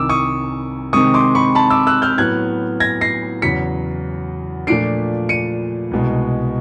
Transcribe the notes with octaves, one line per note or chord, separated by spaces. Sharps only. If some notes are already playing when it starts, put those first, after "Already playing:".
Already playing: C2 C3 D#3 D6 E6
C#6 D#6
C3 D#3 G#3 C4 C#6 D#6
C6 D6
B5 C#6
A5 B5
D6 E6
E6 F#6
F6 G6
A2 F#3 B3 F#6 G#6
G#6 A#6
A#6 C7
E2 C#3 F#3 B6 C#7
A#2 F3 A3 D4 C7 D7
C#7 D#7
C2 B2 G#3